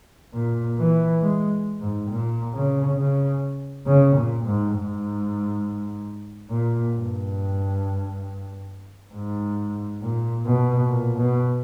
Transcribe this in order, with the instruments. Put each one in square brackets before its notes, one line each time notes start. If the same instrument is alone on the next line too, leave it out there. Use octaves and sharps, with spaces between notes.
[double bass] A#2
E3
G#3
G#2
A#2
C#3
C#3
C#3
A#2
G#2
G#2
A#2
G2
G#2
A#2
B2
A#2
B2